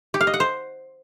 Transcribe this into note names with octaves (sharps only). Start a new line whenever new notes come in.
G4
F5
D#5
F#5
C5